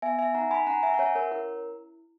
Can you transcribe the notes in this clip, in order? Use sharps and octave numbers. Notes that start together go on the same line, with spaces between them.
B3 E5 G#5
E5 G#5
D#4 F#5 A#5
G#5 B5
C#4 F#5 A#5
E5 G#5
F#5
C#4 C#5 E5
A#4 C#5
E4 A#4